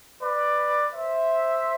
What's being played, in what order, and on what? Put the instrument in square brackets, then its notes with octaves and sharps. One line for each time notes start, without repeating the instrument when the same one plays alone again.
[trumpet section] B4 D5
C5 E5